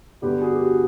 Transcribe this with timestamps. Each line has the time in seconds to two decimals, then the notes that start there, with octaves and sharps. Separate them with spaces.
0.21 G2 D3 G3 B3 G4
0.40 F#4 G#4
0.55 G4
0.60 F#4